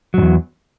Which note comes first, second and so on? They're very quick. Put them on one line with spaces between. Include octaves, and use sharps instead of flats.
F#3 G#2 E2